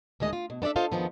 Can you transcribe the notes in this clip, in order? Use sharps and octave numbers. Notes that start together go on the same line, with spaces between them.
D2 D#3 G#3 D#5
F4
B2
B3 D4 A4 D5 E5
F4 A4 C5 D#5 F5
E2 D#3 F3 B3